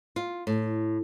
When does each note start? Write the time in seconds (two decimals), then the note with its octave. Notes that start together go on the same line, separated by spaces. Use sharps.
0.16 F4
0.47 A2